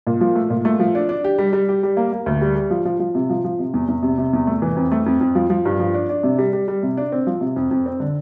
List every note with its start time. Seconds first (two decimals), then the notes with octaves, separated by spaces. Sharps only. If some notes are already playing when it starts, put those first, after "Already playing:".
0.07 A#2
0.21 F3
0.35 A3
0.50 A#2
0.65 A3
0.80 F3
0.95 D4
1.09 D4
1.24 G4
1.38 G3
1.53 G3
1.69 G4
1.83 G3
1.97 A#3
2.12 A#3
2.26 D2
2.42 G3
2.56 G3
2.71 F3
2.85 F3
3.00 F3
3.15 C3
3.30 F3
3.44 F3
3.59 C3
3.74 E2
3.88 E2
4.03 C3
4.18 C3
4.33 E2
4.47 A3
4.62 E3
4.76 F2
4.92 A3
5.06 F2
5.21 F2
5.35 F3
5.50 F3
5.65 G2
5.80 F3
5.94 D4
6.09 D4
6.23 C3
6.38 G3
6.53 G3
6.68 G3
6.83 C3
6.97 D4
7.12 C4
7.27 F3
7.41 C3
7.56 F2
7.71 F2
7.86 C4
8.00 D3